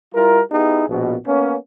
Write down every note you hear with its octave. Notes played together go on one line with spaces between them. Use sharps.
G3 E4 F4 A#4
B3 D#4 E4 G4 G#4
A#1 B2
A#3 B3 C#4